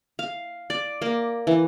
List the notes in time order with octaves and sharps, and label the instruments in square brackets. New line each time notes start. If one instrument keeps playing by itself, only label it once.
[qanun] F5
D5
A#3
E3